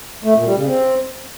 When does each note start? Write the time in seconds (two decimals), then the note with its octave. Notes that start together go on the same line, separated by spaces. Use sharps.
0.24 A3
0.35 A#2
0.45 G3
0.56 C#3
0.67 C4